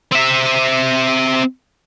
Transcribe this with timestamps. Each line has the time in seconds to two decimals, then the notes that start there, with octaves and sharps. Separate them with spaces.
0.12 C4 E5